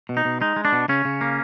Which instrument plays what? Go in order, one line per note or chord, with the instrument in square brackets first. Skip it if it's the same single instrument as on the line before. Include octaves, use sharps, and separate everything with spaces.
[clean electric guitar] B2
D#4
B2
G#3 D#4
G#3
D4
B2
C#3 C#4
C#3
A#3